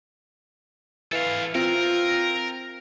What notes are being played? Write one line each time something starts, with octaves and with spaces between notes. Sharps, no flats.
E3 A4 F5
C4 F4 A#4